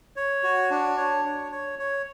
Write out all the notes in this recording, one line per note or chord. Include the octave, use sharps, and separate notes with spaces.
C#5
F#4
D4
C#5
C#5
C#5
C#5